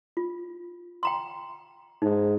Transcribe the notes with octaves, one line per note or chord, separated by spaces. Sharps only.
F4
G5 A#5 C6
G#2 D#4